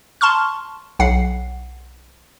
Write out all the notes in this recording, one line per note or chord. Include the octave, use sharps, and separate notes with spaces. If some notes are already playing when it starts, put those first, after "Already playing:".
A5 C6 C#6 F6
B1 F#5 C7